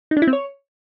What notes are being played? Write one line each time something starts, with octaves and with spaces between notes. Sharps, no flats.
D#4
D4
E4
C4
C#5